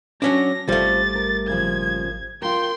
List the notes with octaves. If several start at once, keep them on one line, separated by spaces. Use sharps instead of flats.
F#3 C#4 D4 A#6
G#1 G3 A3 C4 F4 C5 A6
A#4
A#2 C#3 F3 G#6
F4 A#4 G5 C6